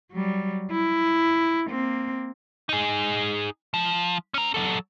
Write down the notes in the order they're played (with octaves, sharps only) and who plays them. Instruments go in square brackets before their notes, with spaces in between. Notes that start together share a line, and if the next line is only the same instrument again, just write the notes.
[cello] F#3 G3
E4
A#3 C4
[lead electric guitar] D#4 G#4
F3
C#4 A#5
F#3 A4